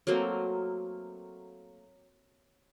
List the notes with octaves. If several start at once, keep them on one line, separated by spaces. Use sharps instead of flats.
F#3 A3 A#3 C4